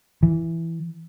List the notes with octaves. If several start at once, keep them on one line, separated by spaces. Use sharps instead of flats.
E3